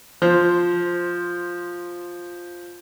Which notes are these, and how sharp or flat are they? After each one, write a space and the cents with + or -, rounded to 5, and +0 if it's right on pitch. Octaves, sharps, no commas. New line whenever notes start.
F3 +5 C5 +0